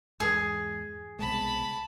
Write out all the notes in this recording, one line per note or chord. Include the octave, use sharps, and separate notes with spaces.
E2 G#2 G#4
C2 B2 G#3 A5 B5